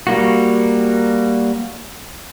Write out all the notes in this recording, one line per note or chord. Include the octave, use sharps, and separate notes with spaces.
G3 A#3 F#4